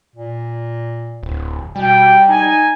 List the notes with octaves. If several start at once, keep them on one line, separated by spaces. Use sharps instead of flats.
A#2
D1
B2 G3 G5
D#4 G#5